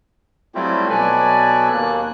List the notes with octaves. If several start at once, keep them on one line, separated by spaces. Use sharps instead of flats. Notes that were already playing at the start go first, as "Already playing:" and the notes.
F#3 G3 A3 C4 E4 F4
B2 F#3 A4 B4 D5 G#5
D#2 A#3 F#6